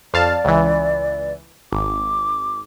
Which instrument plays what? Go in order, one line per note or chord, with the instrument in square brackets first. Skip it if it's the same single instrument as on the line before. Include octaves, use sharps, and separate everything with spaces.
[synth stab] F2 F5 A5 [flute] D5
[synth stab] C#2 E3
[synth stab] G#1 [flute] D6